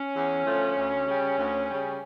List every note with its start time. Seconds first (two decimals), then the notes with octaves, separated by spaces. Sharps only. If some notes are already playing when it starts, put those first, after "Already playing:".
Already playing: C#4
0.15 E2
0.45 D3 F3 A3
0.76 D2
1.07 C#3 G3
1.37 D2
1.68 C#3 G3